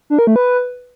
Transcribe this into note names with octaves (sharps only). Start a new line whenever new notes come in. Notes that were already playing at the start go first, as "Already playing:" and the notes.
D4
A#4
A3
B4